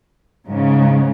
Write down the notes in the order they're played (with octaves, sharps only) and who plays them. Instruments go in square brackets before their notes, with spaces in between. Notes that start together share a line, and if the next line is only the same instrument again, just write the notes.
[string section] G#2 C#3